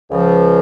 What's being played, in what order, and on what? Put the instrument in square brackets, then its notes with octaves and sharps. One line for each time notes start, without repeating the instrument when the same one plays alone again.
[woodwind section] C#2 C#3 F3